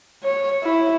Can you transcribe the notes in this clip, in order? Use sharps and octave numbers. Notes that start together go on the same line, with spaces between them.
C#5
E4